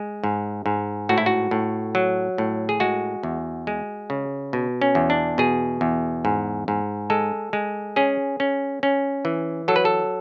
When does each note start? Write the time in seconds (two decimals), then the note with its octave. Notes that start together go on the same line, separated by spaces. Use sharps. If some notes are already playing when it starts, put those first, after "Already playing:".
Already playing: G#3
0.24 G#2
0.66 G#2
1.09 A2 F#4
1.18 E4
1.26 F#4
1.51 A2
1.95 F#3
2.38 A2
2.69 G#4
2.80 G#3 F#4
3.23 E2
3.67 G#3
4.10 C#3
4.53 B2
4.82 C#4
4.95 E2
5.10 D4
5.38 B2 G#4
5.81 E2
6.25 G#2
6.68 G#2
7.10 G#3 A4
7.53 G#3
7.96 C#4 G#4
8.40 C#4
8.83 C#4
9.25 E3
9.68 F#3 A4
9.76 B4
9.85 A4